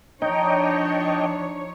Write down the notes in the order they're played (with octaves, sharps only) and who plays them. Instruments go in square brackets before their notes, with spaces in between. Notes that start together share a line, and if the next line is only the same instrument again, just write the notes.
[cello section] F3 C#5 [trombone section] D4 [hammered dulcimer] D#4 [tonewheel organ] D#5 G5